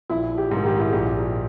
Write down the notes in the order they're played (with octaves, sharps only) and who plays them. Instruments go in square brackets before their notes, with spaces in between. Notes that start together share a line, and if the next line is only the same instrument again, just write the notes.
[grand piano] A#1 [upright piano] E4
[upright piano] G4
[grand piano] G#2
D#3
[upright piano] G4
E4
[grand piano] A#1 [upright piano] G4